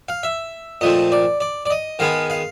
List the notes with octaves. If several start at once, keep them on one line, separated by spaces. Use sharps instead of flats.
F5
E5
A#2 F3 A3 C4 D#5
D5
D5
D5
D#5
D#3 G#3 B3 F5
F5